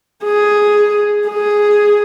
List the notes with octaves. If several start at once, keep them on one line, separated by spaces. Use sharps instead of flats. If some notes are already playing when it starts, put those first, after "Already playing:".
G#4
G#4